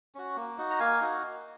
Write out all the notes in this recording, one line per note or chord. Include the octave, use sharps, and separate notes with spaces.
C#4 F#4
A#3
D#4 F#4
A#5
A#3 F5 G#5
D#4 F#4